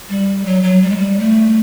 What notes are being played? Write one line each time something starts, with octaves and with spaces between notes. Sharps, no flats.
G3
F#3
F#3
G3
G#3
G3
A3